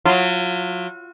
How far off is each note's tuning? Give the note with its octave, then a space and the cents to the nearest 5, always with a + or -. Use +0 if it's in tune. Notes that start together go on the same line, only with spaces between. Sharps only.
F#3 -35 F4 -25